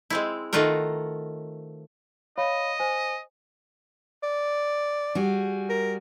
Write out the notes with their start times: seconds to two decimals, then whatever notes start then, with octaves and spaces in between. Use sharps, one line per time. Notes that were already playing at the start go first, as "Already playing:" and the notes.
0.10 G#3 C4 E4
0.53 D#3 A3 F4 F#4 A#4
2.38 C#5 D#5 F5 B5
2.79 C5 G#5
4.23 D5
5.15 G3 F#4 G#4
5.69 A#4